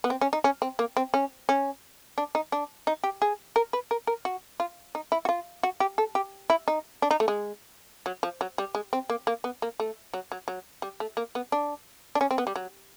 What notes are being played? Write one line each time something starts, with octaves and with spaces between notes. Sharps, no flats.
B3
C4
C#4
D#4
C#4
C4
A#3
C4
C#4
C#4
D4
D#4
D4
D#4
G4
G#4
A#4
B4
A#4
A#4
F#4
F4
D#4
E4
F#4
F4
F#4
G4
A4
G4
E4
D#4
D4
D#4
A3
G#3
F#3
F3
F#3
G3
G#3
C4
A#3
A#3
B3
A#3
A3
F#3
F#3
F#3
G3
A3
A#3
B3
D4
D4
C#4
C4
B3
G3
F#3